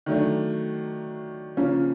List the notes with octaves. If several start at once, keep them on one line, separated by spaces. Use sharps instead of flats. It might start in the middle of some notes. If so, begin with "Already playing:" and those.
D#3 F#3 A3 D4
C#3 F3 A#3 C#4